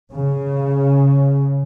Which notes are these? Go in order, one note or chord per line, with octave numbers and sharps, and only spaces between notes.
C#3